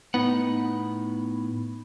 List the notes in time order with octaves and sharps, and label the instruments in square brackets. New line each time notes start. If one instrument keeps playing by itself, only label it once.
[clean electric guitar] A2 D#4 F#5 [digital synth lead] B3